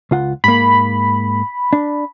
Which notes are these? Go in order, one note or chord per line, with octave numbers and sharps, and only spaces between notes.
C#2 F4 F#5
G#2 A#3 B5
D4